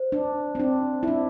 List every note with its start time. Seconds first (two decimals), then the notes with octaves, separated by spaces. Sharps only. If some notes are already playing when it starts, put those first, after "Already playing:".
Already playing: C5
0.12 D4
0.55 C4
0.60 D4
1.03 E4
1.08 D4